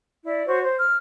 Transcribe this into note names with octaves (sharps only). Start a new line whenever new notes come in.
E4 D5
F#4 C5 C#5 C#6
C5
F6